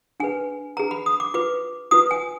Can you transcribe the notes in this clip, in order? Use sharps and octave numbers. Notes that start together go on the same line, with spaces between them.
D4 G#4 B4 G#5
D4 G#4 B4 A#5
B5
D#6
D6
F4 B4 D6
F4 B4 D#6
G#5